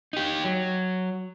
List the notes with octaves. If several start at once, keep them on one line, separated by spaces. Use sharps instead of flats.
D#4 G4
F#3